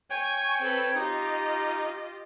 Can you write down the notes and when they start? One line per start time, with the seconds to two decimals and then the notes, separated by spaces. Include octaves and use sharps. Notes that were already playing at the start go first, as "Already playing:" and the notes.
0.10 C#5 G5 G#5 C#6
0.61 C4 A4 B4
0.95 D#4 F4 G4 D#5